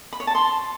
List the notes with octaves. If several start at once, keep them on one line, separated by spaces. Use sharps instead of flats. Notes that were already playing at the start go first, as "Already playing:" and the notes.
B5
C#5
A5
C6